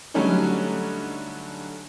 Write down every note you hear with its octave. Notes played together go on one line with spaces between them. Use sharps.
D3 F#3 G3 A3 C#4 D#4